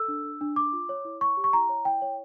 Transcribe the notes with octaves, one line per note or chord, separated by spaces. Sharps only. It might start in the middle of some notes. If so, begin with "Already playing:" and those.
Already playing: A4 E6
D4
D4
D4
D4 D6
F4
C#5
E4
C#5 C#6
G4
C#6
E4 A#5
C#5
E4 G5
C#5